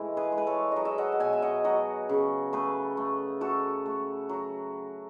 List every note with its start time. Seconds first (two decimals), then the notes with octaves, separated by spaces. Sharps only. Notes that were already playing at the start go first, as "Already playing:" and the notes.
Already playing: A2 E3 G#3 E4
0.17 G#4 B4
0.32 G#3
0.38 B4
0.47 A4 C#5
0.72 F#3 D#5
0.85 E5
0.98 D#5 F#5
1.12 F#5
1.20 B2 E5 G#5
1.33 E5
1.42 D#5 F#5
1.64 F#3 D#5 F#5
2.09 C#3
2.53 A3 G#4 B4
2.97 A3
3.41 A3 F#4 A4
3.86 A3
4.29 F#3